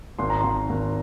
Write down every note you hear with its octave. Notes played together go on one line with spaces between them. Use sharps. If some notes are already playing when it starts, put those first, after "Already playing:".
G#1 C6
A#5
G#1 C6
G#1